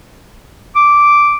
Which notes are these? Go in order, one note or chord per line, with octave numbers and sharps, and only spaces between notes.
D6